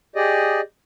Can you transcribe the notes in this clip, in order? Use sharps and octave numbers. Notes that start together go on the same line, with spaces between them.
G4 G#4 D5 D#5